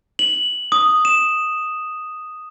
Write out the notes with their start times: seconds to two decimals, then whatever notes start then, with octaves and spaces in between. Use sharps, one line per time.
0.19 F#7
0.72 D#6
1.05 E7